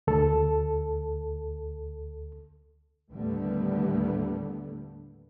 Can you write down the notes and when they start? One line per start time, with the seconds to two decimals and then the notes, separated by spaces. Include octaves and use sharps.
0.07 D2 A4
3.12 D#2 A2 D3 G3 A3 B3